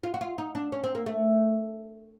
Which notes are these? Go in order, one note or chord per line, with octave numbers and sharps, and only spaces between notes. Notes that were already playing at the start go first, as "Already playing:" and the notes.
F4
F#4
F4
D#4
D4
C#4
C4
A#3
A3